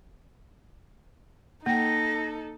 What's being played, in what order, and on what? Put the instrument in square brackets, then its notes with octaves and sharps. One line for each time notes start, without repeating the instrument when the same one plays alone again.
[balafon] A#3 G5 [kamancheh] D#4 A4 [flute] A#6